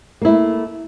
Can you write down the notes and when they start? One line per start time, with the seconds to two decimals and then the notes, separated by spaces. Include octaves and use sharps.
0.22 A#3
0.25 E4
0.28 A3